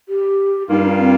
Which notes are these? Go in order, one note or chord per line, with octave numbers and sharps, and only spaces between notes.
G4
G2 G3 A#3 D#4 F4
C#4
C4